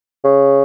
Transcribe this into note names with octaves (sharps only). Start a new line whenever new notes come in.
C#3